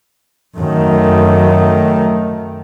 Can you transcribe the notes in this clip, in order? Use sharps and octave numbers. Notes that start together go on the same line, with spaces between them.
F#2 D#3 A3